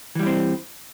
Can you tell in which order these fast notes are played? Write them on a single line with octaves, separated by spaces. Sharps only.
E3 G3 E4 C4